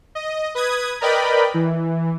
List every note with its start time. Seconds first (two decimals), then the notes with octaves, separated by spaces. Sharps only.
0.15 D#5
0.55 B4 D#6 G#6
1.01 A#4 B4 D5 D#5 G5 B5
1.54 E3